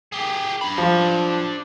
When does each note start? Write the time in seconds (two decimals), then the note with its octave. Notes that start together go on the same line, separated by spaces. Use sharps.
0.12 G4 G#4
0.61 D4 B5
0.78 F3